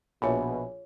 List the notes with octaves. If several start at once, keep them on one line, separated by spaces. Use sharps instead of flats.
A#1 B2 F4 G#4 C#5 E5 G#5 B5